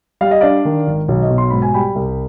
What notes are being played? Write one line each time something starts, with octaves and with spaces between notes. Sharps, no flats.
G3 F5
D#5
D4 D5 F5
D#3
G#1
B1
D#5
B2
C6
G#2 B5
G#5
G3 G5 B5
C2